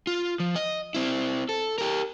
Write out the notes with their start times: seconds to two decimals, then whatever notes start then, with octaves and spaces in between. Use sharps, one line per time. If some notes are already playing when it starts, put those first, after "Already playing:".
0.07 F4
0.40 F3
0.56 D#5
0.94 C4 E4
1.49 A4
1.78 G4 A#4